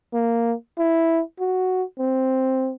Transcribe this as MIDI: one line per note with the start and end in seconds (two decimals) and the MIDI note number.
0.14 0.53 58
0.78 1.21 64
1.40 1.83 66
1.99 2.72 60